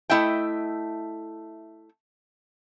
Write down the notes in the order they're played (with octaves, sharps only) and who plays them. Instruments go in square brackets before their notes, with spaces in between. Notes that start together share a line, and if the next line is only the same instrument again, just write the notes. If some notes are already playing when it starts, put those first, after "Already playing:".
[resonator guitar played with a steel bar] A3 E4 D#5 E5 G5